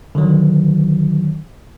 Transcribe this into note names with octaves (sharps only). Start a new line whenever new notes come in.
D3 D#3 F#3